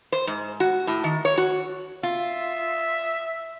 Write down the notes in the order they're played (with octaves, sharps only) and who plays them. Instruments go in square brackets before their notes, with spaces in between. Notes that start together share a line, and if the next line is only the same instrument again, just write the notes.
[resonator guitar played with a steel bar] C5
G#2
F#4
A2
D#3
C#5
F#4
[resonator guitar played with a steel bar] F4 [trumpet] E5